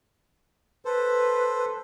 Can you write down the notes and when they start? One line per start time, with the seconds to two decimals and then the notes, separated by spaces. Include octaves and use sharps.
0.85 A4 B4 C5